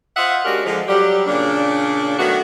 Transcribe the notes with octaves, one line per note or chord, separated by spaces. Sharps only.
F4 C5 D#5 E5 F#5
G#3 C#4 D4 F#4 G4 A#4
D3 F3 G#3
F#3 G3 G4
A#2 C#3 A#3 D4
D#3 F#3 A3 B3 D4 F#4